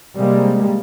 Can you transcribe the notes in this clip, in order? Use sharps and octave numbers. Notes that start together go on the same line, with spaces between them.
C3 G3 G#3 A#3